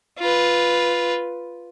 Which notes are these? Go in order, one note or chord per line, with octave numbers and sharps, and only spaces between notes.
F4 B4